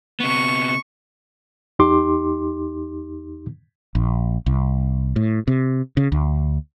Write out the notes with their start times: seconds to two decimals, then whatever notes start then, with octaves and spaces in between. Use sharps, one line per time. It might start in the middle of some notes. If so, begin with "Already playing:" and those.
0.20 C3 B3 C#6
1.79 E2 D#4 G4 C6 D6
3.95 A#1
4.46 C2
5.16 A2
5.48 C3
5.97 C#3
6.12 D2